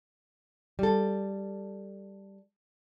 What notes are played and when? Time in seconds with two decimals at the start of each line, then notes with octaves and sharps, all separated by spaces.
0.79 G3 A4